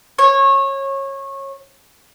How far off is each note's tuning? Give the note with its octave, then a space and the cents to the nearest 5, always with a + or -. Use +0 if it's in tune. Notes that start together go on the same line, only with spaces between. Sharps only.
C#5 -25